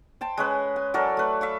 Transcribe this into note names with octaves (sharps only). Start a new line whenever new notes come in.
C5 G5 A5
G#3 C#4 B4
G#5
F#3 A4 A#4 D5
A3 B4
E5 F5 C#6